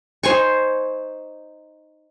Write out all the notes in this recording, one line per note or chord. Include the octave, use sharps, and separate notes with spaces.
D#4 C5 G#5 C#6